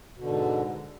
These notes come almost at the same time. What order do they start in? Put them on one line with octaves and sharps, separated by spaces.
B2 D3 G#2